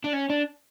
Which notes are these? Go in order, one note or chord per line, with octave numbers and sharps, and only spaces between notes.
D4
C#4
D4